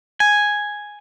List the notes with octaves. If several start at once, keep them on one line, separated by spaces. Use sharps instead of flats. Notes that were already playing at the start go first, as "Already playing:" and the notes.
G#5